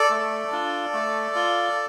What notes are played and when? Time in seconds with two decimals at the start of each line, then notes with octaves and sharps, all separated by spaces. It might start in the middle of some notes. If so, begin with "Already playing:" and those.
Already playing: A4 D5
0.10 A3
0.52 D4 F4
0.94 A3
1.35 F4